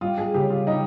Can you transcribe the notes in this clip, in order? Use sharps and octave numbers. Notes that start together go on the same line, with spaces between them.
G3 F4
G#4
C#3 G4
F4
G3 D#4